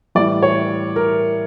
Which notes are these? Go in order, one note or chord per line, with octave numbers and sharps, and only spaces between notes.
A2 E3 G3 D5
C#5
A#4